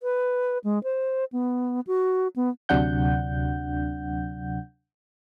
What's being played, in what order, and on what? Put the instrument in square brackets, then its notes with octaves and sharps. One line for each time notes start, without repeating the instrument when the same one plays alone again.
[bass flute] B4
G#3
C5
B3
F#4
B3
[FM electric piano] D2 C3 F#3 D4 F#5 G6